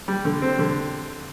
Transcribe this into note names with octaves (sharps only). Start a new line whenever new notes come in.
G3
D3
C4
D3